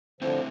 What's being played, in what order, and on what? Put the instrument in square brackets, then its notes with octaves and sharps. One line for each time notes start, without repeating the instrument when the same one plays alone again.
[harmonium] D3 F3 [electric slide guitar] A3 C4 E4